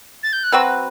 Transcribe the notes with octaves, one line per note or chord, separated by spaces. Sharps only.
A6
G6
F#6
F#3 C4 F#4 B4 E6